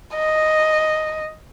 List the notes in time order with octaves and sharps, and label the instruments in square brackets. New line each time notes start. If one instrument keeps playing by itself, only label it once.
[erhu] D#5